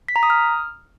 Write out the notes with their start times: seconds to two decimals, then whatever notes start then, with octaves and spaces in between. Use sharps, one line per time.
0.08 B6
0.16 A#5
0.23 D#6
0.30 F6